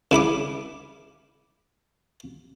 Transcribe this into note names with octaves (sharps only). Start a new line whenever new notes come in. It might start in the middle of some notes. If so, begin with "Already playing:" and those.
C#3 E4 B5 D6